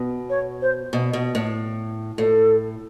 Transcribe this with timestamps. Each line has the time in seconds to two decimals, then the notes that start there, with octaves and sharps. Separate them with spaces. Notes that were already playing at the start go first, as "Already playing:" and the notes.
Already playing: B2
0.30 C#5
0.62 C5
0.93 B2
1.13 B2
1.35 A2
2.18 A2 A4